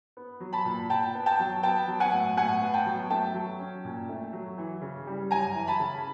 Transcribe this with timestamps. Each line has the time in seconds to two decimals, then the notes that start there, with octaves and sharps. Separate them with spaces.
0.17 B3
0.40 F#3
0.53 A5 B5
0.65 A#2
0.89 A#2 G5 A5
1.15 B3
1.26 G5 A5
1.40 F#3
1.63 B3 G5 A5
1.88 F#3
2.00 F#5 G#5
2.12 A2
2.36 A2 F#5 G#5
2.61 B3
2.74 G5 A5
2.86 F#3
3.10 A3 G5 A5
3.34 F#3
3.59 C#4
3.85 A#2
4.09 A3
4.33 F#3
4.58 E3
4.82 C#3
5.07 G3
5.31 F#2 G#5 A#5
5.55 E3
5.67 A5 B5
5.80 C#3